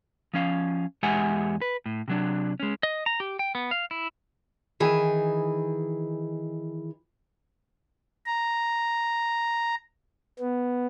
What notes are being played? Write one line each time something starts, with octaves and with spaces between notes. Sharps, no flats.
F3 C#4 F5
E2 G#3 G4 E5 F#5 G#5
B4
A2
C3 F#3 D4
G#3 C#4
D#5
A#5
G4
G5
B3
F5
E4
D#3 E3 G#4
A#5
B3